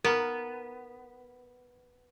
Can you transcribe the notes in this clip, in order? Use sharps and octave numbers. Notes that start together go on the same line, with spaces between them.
B3 A#4